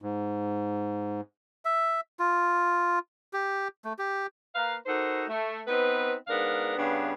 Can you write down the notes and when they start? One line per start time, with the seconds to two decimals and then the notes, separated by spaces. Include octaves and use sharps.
0.02 G#2
1.65 E5
2.19 F4
3.33 G4
3.85 A3
3.99 G4
4.55 A#3 A#4 B4 F5
4.86 D#4 F#4 A4 A#4 C5
5.28 A3
5.67 B3 C4 D#4 B4
6.28 G#2 B3 D4 A#4 F5
6.78 G2 C#3 B3 D4